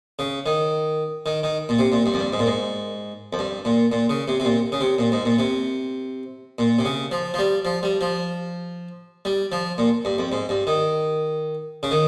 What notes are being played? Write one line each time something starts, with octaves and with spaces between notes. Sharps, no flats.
C#3
D#3
D#3
D#3
A#2
C3
A#2
G2
F2
G2
G#2
A#2
G#2
F2
G2
A#2
A#2
C#3
C3
C3
A#2
C#3
C3
A#2
G#2
A#2
C3
A#2
C3
C#3
F3
F3
G3
F3
G3
F3
G3
F3
A#2
G2
F2
G#2
G2
D#3
C#3
D#3